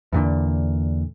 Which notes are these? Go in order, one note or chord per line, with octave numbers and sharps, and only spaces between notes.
E2 A#2 D3